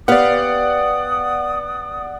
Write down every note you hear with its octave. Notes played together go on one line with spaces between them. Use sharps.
B3 G4 D5 F5 F#5 D#6